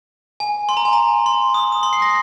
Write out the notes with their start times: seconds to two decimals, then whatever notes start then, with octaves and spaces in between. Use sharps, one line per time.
0.40 G#5
0.69 C6
0.77 A#5
0.85 G#5
0.93 A#5
1.26 C6
1.54 D#6
1.72 D#6
1.83 C6
1.93 C7
2.02 A#6